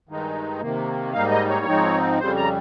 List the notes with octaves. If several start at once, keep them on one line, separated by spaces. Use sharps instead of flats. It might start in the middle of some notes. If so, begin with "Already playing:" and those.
G2 D#3 G#3 D#4
C3 D#3 A#3
G#2 G3 A#3 D#4 F5
D#5
C#5
G#2 F3 C4 D#4
F2 C#3 G3 C5
A#5